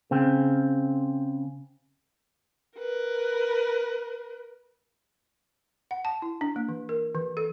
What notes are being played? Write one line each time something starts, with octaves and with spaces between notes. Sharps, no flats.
C#3 C4
A#4 B4
F#5
A5
E4
D4
A#3
E3
A#4
E3
A4